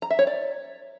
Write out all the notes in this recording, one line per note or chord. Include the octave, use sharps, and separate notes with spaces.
A#5
E5
C#5
D5